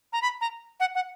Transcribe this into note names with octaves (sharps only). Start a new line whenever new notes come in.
A#5
B5
A#5
F#5
F#5